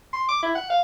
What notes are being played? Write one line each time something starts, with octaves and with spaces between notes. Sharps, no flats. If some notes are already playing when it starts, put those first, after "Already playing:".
C6
D6
E4
F#5
F5